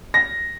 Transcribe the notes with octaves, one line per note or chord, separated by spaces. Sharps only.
A#6